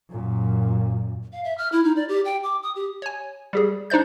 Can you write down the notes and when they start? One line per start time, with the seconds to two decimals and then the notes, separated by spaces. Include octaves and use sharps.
0.10 F#2 A#2
1.33 F5
1.44 E5
1.58 F6
1.72 E4
1.84 D#4
1.96 D5
2.09 G4
2.25 G5
2.43 D6
2.63 D#6
2.76 G4
3.02 C#5 G#5
3.53 G3 G4 G#4
3.90 D4 D#4 C5 D5 G6